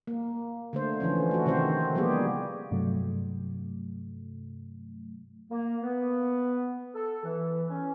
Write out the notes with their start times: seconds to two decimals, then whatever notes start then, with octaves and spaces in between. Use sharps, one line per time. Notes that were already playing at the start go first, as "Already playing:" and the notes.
0.07 A#3
0.73 D3 A3 C5
1.00 D3 E3 F3 C#4
1.31 A3 F#4
1.46 C3 D#3 C4 C5
1.95 F3 G3 A#3 B3 G4 G#4
2.71 G2 C3 F#3 A3
5.50 A#3
5.82 B3
6.94 A4
7.24 E3
7.70 C#4